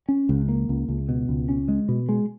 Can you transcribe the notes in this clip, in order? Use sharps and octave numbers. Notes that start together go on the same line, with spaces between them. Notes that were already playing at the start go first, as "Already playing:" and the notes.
C#4
C#2
A#3
C#2
C#2
B2
C#2
C#4
G#3
B2
G#3